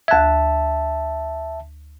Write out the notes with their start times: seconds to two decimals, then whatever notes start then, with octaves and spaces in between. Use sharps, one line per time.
0.08 D2 E5 A5 F#6 G#6